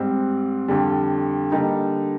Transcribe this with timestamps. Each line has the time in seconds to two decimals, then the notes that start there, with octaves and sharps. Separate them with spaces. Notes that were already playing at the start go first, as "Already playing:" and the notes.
Already playing: G#2 G3 C4
0.68 F2 D3 G3
1.52 D3 G3 A#3 D#4